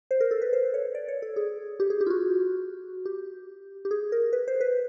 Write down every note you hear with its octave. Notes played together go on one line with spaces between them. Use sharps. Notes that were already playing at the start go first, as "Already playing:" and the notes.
C5
A#4
A4
B4
C5
C#5
D5
C#5
A4
G#4
G4
G#4
G4
F4
F#4
G4
G4
G#4
A#4
B4
C5
B4